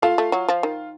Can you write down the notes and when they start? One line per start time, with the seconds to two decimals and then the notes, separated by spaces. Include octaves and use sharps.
0.02 A3 F4 F5
0.18 A3
0.32 F#3
0.48 F3
0.63 D#3